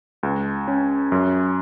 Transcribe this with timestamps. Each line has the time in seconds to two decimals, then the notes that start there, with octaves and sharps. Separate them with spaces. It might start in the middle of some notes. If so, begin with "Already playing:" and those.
0.23 C#2
0.68 C#4
1.12 F#2